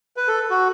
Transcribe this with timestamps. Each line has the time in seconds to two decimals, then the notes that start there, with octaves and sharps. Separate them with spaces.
0.17 B4
0.28 A4
0.51 F#4